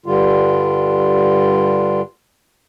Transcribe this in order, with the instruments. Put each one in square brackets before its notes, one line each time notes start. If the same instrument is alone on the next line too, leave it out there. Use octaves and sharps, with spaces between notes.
[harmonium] G2 D3 G3 F4